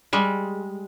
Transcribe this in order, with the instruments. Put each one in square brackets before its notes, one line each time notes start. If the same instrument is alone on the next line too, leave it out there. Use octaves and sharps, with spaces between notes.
[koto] G3 G#3